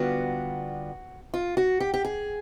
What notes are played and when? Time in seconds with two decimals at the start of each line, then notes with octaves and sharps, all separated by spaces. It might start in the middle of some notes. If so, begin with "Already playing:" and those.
Already playing: D3 G3 B3 D4 F4 F#4
1.34 F4
1.57 F#4
1.80 G4
1.94 G4
2.05 G#4